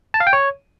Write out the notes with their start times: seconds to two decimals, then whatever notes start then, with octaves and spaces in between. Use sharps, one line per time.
0.14 A5
0.20 F5
0.27 G5
0.33 C#5